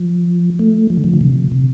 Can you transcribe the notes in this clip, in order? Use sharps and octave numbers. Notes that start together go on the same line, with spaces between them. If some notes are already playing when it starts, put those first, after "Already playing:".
Already playing: F3
A3
F3
D3
F3
D3
C3
C3